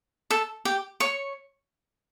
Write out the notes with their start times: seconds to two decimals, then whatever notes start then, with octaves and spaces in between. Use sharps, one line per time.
0.30 A4 A5
0.65 G4 G5
1.00 C#5 C#6